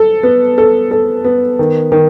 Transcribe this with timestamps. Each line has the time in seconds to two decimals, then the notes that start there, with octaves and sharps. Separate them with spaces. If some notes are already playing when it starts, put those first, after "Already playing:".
Already playing: A4
0.23 B3
0.58 A4
0.91 A4
1.24 B3
1.59 D#3
1.92 D#3